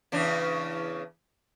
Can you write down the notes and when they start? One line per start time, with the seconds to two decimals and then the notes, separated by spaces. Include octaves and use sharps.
0.12 E2 C#3 D4